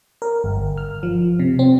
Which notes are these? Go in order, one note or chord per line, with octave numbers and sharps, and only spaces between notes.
A#4
G1
F6
F3
C3
C4